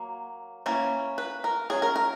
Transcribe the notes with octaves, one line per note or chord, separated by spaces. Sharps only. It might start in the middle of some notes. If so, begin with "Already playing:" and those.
Already playing: F#3 A#3
E3 A#3 C#4
B4
A#4
F#3 C#4 G#4
A#4
A#4